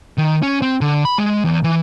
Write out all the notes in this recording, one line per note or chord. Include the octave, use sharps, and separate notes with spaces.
D#3
C#4
C4
D3
B5
G#3
E2
E3